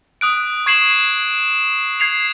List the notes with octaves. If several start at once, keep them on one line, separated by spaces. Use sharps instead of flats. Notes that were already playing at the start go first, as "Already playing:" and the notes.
D#6 F#6 D7
C#6 G#6 C7 E7 F#7
G#6 C7 F7